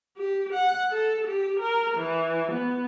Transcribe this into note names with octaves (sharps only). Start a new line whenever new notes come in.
G4
F#5
A4
G4
A#4
E3
B3